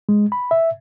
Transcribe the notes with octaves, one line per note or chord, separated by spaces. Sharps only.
G#3
B5
E5